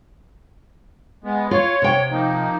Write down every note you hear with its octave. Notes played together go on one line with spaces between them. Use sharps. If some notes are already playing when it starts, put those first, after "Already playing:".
G#3 B3
F4 C#5
C3 G5
F3 A#3 D#4